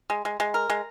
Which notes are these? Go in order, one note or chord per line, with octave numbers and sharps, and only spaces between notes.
G#3
G#3
G#3
A#4
G#3